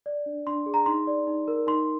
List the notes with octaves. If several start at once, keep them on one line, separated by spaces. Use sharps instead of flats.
D5
D4
D4 C6
G#4
A#5
D#4 C6
D5
D#4
A#4
D#4 C6